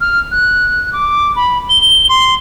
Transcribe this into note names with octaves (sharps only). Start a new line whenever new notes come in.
F6
F#6
D6
B5
G7
C6